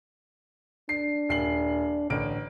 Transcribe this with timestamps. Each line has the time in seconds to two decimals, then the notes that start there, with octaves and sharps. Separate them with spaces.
0.89 D4 C7
1.29 D#1 C7 F#7
2.10 A1 D3 D7